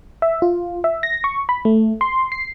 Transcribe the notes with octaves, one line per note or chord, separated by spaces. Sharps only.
E5
F4
E5
A#6
C#6
B5
A3
C6
C7